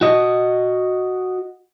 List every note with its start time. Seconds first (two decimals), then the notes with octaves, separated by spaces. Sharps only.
0.01 F#4 D#5